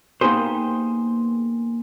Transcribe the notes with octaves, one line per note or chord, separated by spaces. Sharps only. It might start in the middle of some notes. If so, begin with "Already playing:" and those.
A#3 B3 D#4 G4 G#4 C5